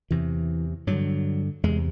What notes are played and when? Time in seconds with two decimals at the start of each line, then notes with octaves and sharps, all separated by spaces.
0.11 E2 C3 E3
0.87 G2 D3 F#3
1.63 E2 C3 G#3